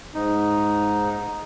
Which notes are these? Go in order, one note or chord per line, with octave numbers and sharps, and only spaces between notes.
G#2 D#4